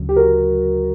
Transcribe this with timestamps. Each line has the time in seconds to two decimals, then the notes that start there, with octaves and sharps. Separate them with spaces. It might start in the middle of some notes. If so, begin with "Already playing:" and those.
Already playing: D2 C#3 F#3
0.09 G4
0.16 F#4 A#4